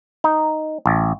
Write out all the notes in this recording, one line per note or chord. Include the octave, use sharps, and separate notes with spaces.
D#4
A1